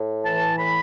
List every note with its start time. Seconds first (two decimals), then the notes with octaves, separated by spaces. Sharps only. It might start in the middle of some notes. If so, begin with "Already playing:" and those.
Already playing: A2
0.25 E3 A5
0.58 A2 B5